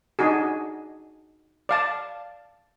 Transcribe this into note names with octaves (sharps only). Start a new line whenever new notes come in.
D4 D#4 F#4 G#4
D5 F5 A5